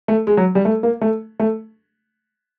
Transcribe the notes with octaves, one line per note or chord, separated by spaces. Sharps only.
A3
G#3
F#3
G3
A3
A#3
A3
A3